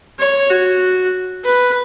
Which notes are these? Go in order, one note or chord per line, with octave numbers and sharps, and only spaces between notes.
C#5
F#4
B4